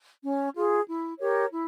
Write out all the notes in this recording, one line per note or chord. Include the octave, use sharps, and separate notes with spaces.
C#4
F4 G#4
E4
G4 A#4 C#5
E4